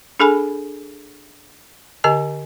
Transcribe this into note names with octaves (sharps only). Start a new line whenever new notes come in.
D4 G#4 A4 G#5 B5
D3 G4 D#5 G#5